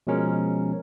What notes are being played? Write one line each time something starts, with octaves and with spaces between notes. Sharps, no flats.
B2 F3 G#3 C#4 A#4